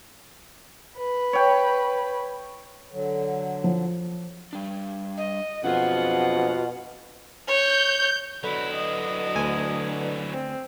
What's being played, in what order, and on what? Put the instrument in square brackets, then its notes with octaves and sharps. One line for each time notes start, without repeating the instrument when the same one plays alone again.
[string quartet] B4
[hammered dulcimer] C#5 G5
[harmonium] D3 F#3
[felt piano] F3
[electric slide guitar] G3 D4
[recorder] D#5
[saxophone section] F2 F#5 [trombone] B2 [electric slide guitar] D4 G#4 C5 [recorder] F4
[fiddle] C#5 [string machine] G6
[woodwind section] B2 D3 [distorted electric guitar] F#3 E4 [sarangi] B4
[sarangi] D#5
[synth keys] D2 G#5
[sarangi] C4